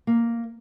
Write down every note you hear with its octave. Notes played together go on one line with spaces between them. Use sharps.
A#3